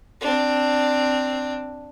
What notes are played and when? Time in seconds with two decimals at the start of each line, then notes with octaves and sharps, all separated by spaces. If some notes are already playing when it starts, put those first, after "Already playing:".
0.21 C4 D4